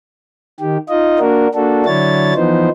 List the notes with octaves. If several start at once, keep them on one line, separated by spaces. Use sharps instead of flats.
D#3 G4
D#4 F4 D#5
A#3 D4 F#4 A#4
A#3 D4 F#4 A4
D3 F#3 D4 E4 C#5 A6
E3 F3 B3 D#4 C5